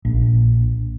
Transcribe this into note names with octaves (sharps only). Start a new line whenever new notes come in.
A#1